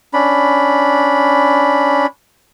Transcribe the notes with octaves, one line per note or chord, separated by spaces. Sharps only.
C#4 D4 B5